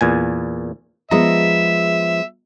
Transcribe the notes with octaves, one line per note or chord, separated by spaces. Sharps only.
E2 A#2 G#5
F3 G#3 B3 D#5 E5 A#5